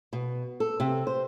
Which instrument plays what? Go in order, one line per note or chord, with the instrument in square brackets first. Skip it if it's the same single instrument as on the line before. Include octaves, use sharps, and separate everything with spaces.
[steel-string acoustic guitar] B2
A4
C3
C5